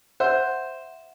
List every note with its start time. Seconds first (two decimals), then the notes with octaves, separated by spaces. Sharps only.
0.20 C5 E5 F#5